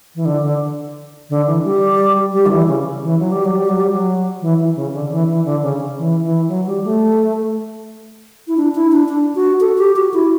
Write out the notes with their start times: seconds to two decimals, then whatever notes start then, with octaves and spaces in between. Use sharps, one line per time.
0.15 E3
0.25 D3
0.43 D3
1.30 D3
1.47 E3
1.63 G3
2.33 G3
2.46 D3
2.51 E3
2.68 C#3
3.03 E3
3.19 F#3
3.32 G3
3.45 F#3
3.57 G3
3.69 F#3
3.80 G3
3.93 F#3
4.41 E3
4.58 E3
4.76 C#3
4.93 D3
5.11 E3
5.28 E3
5.45 D3
5.63 C#3
5.98 E3
6.23 E3
6.49 F#3
6.67 G3
6.84 A3
8.48 E4
8.57 D4
8.75 E4
8.92 D4
9.09 D4
9.35 F#4
9.61 A4
9.78 G4
9.96 F#4
10.14 E4